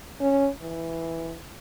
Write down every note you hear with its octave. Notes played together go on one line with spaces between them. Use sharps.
C#4
E3